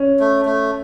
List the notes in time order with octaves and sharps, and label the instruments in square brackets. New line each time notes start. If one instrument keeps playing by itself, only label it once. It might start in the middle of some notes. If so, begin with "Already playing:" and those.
Already playing: [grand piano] C#4
[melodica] A3
A3